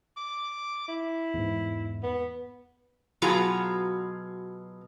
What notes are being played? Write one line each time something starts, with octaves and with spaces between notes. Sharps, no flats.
D6
E4
E2 G#2
B3
B2 F#3 B3 F4 G#4 A#5